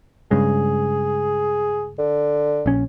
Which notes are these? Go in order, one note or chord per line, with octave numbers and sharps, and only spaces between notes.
G2 C#3 G#3 G#4
D3
A#1 C#4